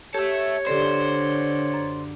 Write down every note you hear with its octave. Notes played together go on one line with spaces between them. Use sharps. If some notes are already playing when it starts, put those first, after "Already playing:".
G4 A4 C#5 E5
D3 G4 A4 C5 D5
F#2